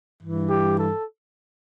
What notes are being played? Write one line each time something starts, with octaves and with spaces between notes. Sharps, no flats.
G2 E3
G4
A4